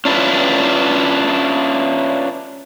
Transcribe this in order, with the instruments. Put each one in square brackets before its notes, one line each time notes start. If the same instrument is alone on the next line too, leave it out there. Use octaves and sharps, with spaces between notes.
[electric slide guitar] C#4 D4 E4 F4 B4